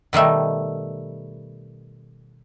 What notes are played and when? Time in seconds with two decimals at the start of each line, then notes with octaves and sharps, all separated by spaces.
0.13 B2 D#3 G3 A3